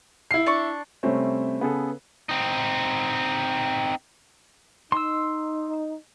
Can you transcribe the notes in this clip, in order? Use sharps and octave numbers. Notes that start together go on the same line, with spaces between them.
E4 C7
D4 C#6
C3 G3 A3 C4 C#4
C#3 B3 G#4 A4
C4 D#4
D#4 C6 E6